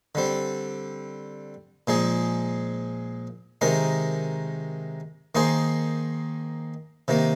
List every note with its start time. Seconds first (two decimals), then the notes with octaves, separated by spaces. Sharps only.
0.15 D3 G3 C4
1.87 A#2 F3 G#3 D#4 G#4
3.61 C3 D#3 G#3 D#4 A#4
5.35 D#3 A#3 D#4 G#4 C5
7.08 C3 D#3 A#3